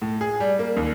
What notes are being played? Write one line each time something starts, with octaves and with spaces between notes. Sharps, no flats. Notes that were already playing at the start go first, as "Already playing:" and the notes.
A2
G#4
G3
A#3
D#2